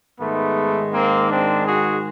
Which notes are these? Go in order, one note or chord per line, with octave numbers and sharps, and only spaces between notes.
G#2 D#3 G#3 A3 B3
A#3 C4
C4 D4
F#4 G#4